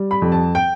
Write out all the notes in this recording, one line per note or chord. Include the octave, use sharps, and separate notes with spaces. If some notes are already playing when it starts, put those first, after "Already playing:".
Already playing: G3
B5
F2
A5
G5